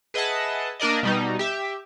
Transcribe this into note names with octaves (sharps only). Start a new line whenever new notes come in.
G#4 B4 D#5 E5 F#5 A5
A#3 D4 A#4 D5 D#5
B2 G3 D#4
G4 E5